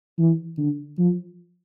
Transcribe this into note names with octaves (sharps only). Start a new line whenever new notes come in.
E3
D3
F3